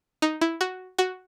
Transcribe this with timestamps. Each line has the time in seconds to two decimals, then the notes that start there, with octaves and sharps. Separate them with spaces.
0.22 D#4
0.41 E4
0.61 F#4
0.98 F#4